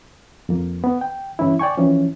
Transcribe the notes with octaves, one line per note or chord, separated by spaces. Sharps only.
F2 A#3
B3
G5
G2 E3 C#4 E4
D5 G5 G#5 C#6
E3 F3 C#4